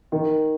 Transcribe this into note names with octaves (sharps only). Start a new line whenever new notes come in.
D#3